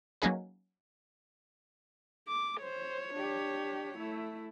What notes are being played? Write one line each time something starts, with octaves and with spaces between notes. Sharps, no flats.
F#3 A#3 C#4 D#4 G#4 B4
D6
C5 C#5
D4 G4
A3 E4